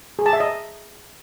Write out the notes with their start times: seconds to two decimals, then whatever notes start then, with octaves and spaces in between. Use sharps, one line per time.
0.19 G#4
0.26 A5
0.33 E5
0.40 D#5